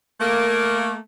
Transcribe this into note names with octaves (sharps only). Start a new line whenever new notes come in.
A3 A#3